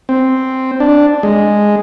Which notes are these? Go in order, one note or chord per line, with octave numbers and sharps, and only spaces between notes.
C4
D4
G#3